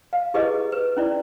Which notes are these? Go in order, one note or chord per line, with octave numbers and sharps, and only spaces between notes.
F5
E4 G4 G#4 B4 D#5
B4
C#4 E4 D5